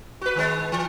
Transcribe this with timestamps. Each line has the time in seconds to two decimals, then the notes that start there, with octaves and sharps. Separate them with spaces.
0.21 F#4 B4
0.35 D#3 G#3 B3
0.72 E3